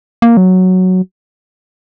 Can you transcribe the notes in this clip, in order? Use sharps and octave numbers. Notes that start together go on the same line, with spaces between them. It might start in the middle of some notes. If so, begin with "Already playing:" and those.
A#3
F#3